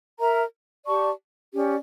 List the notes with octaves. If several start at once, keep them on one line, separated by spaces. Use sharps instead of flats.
A#4 E5 A#5
G4 D5 A5 C#6
C#4 G4 D5